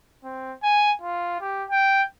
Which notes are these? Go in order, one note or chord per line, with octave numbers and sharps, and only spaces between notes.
C4
G#5
F4
G4
G5